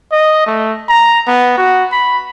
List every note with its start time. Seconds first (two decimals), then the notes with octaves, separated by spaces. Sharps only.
0.12 D#5
0.47 A3
0.88 A#5
1.27 B3
1.58 F#4
1.92 B5